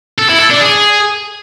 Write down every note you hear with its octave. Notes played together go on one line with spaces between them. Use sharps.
A4
E4
A4
D4
G#4